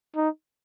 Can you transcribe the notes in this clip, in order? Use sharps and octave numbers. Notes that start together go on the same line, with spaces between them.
D#4